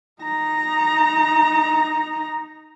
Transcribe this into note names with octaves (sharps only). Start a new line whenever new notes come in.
D#4 A#5